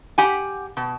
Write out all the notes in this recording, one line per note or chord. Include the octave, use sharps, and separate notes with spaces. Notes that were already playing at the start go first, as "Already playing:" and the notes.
G4 F#5 G#5
B2